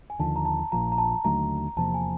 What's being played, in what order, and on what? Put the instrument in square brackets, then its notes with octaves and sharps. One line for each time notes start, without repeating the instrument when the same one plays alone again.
[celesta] G#5
[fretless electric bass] D#2 D3 F3 [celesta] A5
[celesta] A#5
A5
[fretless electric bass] A#1 A#2 F3 [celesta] A#5
[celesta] A#5
A5
[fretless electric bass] D#2 D3 F#3 A3 [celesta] A#5
[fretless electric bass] E2 C3 F3 A#3 [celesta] A5
[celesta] G#5